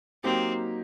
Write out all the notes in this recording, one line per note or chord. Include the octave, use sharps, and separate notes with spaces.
F#3 A#3 C4 D#4 G4